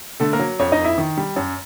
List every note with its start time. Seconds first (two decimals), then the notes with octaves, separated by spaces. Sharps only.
0.20 D3 A3 A4
0.33 A#3 A#4
0.39 F#3
0.59 F2 C#4 C#5
0.72 D#4 D#5
0.79 F2
0.85 E4 E5
0.98 D#3
1.17 G3
1.36 F#2